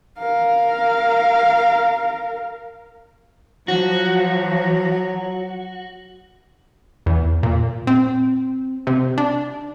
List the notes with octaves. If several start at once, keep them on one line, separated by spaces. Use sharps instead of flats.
A#4 F5
F3 F#3 F#4
E2
A#2
C4
C3
D4